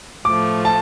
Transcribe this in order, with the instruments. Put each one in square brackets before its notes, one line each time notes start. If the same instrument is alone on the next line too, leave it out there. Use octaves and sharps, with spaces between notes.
[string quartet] A2 F3 A3 [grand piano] D6
[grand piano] A5